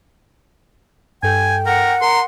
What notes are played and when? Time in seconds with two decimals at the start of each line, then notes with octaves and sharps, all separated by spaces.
1.23 G2 A4 G5 G#5 G6
1.66 A#4 F#5
2.01 A#4 A#5 C6